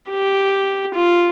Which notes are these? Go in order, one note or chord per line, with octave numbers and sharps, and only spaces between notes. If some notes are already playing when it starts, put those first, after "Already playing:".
G4
F4